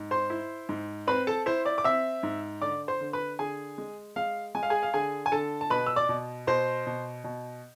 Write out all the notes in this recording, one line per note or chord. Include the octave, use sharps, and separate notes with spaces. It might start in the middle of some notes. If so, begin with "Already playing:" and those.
Already playing: G#2
C5 C6
E4
G#2
C4 B4 B5
A4 A5
E4 C5 C6
D5 D6
D6
C4 E5 E6
G#2
D3 D5 D6
C5 C6
D3
B4 B5
D3 G#4 G#5
G#3
G#3 F5
G#3 G#5
F5
G#4 G#5
F5
D3 G#4 G#5
G#5
D3 A4 A5
A5
B2 B4 B5
E6
D5 D6
B2
B2 C5 C6
B2
B2